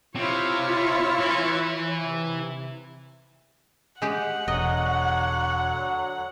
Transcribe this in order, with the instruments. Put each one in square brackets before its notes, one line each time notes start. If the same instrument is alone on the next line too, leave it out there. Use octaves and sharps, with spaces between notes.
[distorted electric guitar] C3 [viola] E4 C#5 [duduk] F4
[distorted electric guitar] E3
[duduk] C3
[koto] G#3 G4 [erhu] F#5
[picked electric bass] E1 [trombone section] D3 F#3 [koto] D#5